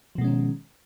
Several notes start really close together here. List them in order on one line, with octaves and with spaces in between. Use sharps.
F3 B2 G#3 C#4 D#3